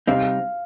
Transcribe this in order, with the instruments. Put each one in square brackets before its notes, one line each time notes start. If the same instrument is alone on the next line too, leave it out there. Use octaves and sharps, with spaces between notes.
[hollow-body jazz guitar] C3 G3 C4 D#4 [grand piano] F5